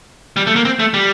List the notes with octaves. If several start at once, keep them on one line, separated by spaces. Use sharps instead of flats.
G3
A3
A#3
C4
A3
G3